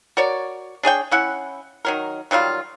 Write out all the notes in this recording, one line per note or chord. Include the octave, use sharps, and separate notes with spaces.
F#4 A#4 C#5 D5
D4 G#4 C#5 G5
C#4 E4 F#5
D#3 F#3 A#4
D#3 F#3 G3 F4